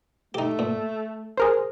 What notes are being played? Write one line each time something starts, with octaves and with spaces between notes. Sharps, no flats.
A3 D#4 G4
A#2
G#4 A#4 C5